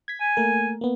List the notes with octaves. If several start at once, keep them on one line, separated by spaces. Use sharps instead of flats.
G#6 B6
G#5
A3 A#3 A#4
A#3 B3